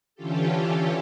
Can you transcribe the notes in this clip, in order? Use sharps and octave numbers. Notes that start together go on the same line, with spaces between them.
D3 E3 C#4 F4 G4 A4